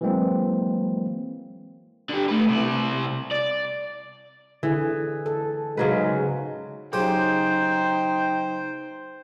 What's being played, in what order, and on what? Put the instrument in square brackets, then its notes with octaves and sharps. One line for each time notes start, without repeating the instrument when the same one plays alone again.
[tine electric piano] E3 F#3 G#3 A#3 C4
[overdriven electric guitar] D3 G4
A3 B4
C3 E4
D5
[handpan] D3 G#4 [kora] E3
[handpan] A4
[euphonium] G#2 [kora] C#3 F#3 B4
[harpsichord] C#3 F#3 G4 [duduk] D#4 [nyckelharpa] C5 [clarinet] G5